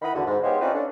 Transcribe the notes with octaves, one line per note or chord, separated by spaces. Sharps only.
D#3 E4 D#5 F#5 B5
E2 D3 F#4
G#2
G#3 B3 G4 C5 C#5 F5
C4 C#4 D#4 F4 B4 D5
C#4 D4 A4